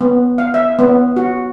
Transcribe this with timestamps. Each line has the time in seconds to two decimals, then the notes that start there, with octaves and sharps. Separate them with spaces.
0.01 B3
0.38 F5
0.54 E5
0.79 B3
1.17 F#4